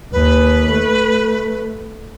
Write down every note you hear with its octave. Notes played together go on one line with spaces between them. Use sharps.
D#2 B4
A3